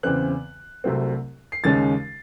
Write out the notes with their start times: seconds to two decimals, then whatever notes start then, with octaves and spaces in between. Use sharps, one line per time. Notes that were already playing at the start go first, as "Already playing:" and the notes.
0.03 E2 C#3 E3 C4 F#6
0.84 C2 C3 F#3 A3 C4
1.52 C7
1.64 D#2 C#3 G#3 C#4 A6